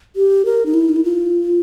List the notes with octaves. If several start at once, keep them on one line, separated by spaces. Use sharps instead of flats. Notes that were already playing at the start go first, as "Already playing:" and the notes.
G4
A#4
D#4
E4
D#4
E4
F4